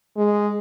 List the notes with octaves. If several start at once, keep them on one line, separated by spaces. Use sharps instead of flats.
G#3